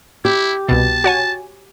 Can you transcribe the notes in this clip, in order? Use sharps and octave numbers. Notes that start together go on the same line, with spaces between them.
E4 G4
C2 B2 A5
F#4 C#5 G#5